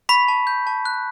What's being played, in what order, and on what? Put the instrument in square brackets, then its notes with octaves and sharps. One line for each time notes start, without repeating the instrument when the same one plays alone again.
[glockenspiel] B5 C#6 B6
A5
G6
A5
F#6